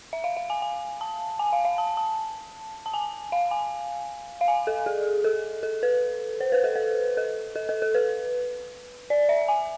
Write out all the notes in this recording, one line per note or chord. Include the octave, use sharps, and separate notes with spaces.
E5
F5
F5
G#5
G#5
A5
G#5
F5
F5
A5
A5
A5
G#5
F5
G#5
F5
G#5
A4
G#4
A4
A4
B4
C5
B4
A4
B4
A4
A4
A4
A4
B4
D5
E5
G#5